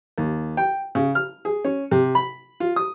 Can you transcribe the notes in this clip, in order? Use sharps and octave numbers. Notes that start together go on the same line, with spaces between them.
D#2
G5
C#3
F6
G#4
C#4
C3
B5
F4
D#6